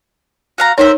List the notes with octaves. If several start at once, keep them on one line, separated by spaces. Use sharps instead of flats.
F#4 F5 A#5
D#4 A#4 C5 C#5 E5